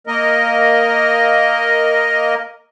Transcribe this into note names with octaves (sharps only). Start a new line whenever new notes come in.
A#3 A#4 D#5